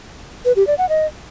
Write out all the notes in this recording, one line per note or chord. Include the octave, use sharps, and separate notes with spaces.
B4
G4
D5
F#5
D#5